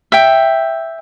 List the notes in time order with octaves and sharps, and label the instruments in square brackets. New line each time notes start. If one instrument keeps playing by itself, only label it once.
[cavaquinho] E5 G5